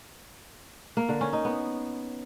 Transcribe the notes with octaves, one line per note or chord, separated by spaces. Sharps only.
A#3
D3
C#4
D#4
B3